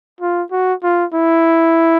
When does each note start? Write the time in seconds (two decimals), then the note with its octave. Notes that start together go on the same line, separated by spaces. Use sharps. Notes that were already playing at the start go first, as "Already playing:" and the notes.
0.20 F4
0.52 F#4
0.83 F4
1.14 E4